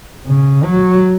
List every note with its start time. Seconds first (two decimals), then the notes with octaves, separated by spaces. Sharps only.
0.26 C#3
0.64 F#3